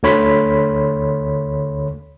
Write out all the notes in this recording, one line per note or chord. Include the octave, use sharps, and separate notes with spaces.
D2 D3 C#5 B5 C6 B6